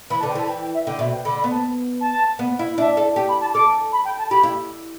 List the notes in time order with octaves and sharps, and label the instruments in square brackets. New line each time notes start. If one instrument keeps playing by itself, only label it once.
[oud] E3 [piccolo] B5
[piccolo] A5
[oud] D3
[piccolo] G5
[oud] E3 [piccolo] A5
[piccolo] G5
G5
E5
[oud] D3 [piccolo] G5
[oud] B2 [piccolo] E5
[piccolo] G5
[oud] D3 [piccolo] B5
[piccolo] B5
[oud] B3
[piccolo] A5
A5
[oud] B3
E4
[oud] D4 [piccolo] E5
[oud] A4
[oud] G4 [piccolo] G5
[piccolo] B5
A5
[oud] A4 [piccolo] D6
[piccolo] B5
G5
A5
[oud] G4 [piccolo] B5
[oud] E4